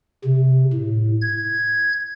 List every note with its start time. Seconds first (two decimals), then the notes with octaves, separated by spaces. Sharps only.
0.24 C3
0.73 A2
1.21 G#6